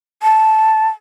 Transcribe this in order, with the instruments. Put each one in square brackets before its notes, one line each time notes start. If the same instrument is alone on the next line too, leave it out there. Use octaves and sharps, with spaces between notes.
[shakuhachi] A5